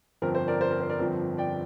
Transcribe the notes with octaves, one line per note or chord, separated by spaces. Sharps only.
G1 F2 F3 C4 A#4
C5
A#4 D5
C5
A#4
C5
A#4 D5
G1 F2 F3 C4
D5 G5